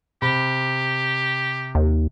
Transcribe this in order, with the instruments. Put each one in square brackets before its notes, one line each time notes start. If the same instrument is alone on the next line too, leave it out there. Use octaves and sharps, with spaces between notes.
[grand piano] C3 B5 [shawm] G4
[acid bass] D#2